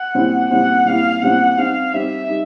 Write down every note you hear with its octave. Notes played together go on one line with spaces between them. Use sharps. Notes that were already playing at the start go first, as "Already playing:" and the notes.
Already playing: F#5
A#2 G3 C4 E4
A#2 G3 C4 E4 F#5
A#2 G3 C4 E4 F5
A#2 G3 C4 E4 F#5
G3 C4 D#4 G4 F5
G3 C4 D#4 G4 E5
G3 D#4